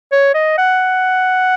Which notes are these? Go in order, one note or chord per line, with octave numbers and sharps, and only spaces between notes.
C#5
D#5
F#5